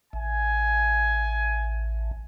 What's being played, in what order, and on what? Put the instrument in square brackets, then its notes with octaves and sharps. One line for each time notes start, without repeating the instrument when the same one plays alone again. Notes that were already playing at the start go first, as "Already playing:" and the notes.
[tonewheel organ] A1 [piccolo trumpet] G#5